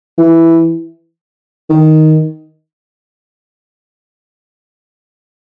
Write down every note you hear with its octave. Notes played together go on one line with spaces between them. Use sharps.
E3
D#3